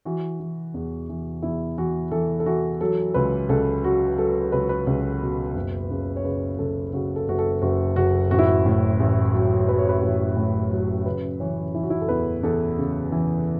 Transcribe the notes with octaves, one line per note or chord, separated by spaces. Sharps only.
E3 F#4
E3
E2
E3
E2 E4
E3 F#4
E3 A4
A4
E3 F#4
F#3 A4
C#2 B4
C#2 A4
F#3 F#4
F#3 A4
C#2 B4
B4
C#2
B2
F#1
C#3
C#5
C#3 B4
F#1 A4
C#3 F#4
A4
F#1 F#4
A4
F#1 F#4
F#1 F#4
A1 F#4
E4
F#4
A2
A1
F#3
F#3 B4
C#5
B4
A1
A2
F#3
C#3 B4
E3 C#5
E3 E4
F#4
E4
A4
E2 B4
E2 A4
C#3
E3